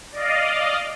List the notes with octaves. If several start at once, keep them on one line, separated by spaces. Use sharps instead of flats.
D5 D#5 F5